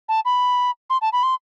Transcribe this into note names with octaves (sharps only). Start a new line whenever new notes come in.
A5
B5
C6
A5
B5
C6